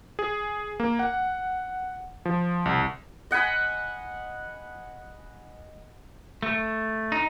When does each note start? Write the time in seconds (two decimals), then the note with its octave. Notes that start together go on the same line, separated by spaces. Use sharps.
0.19 G#4
0.80 A#3
0.99 F#5
2.25 F3
2.65 C2
3.31 D#5 F#5 G#5 B5
6.42 A3
7.12 D#4